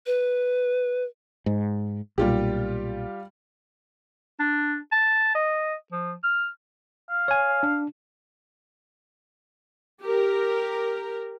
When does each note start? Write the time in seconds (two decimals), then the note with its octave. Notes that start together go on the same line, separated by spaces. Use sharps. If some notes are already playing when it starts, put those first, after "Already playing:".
0.06 B4
1.46 G#2
2.18 B1 A#2 G3 F4 G4
4.40 D4
4.92 A5
5.35 D#5
5.92 F3
6.24 F6
7.09 F5
7.28 C#5 G#5
7.63 D4
10.01 G4 A#4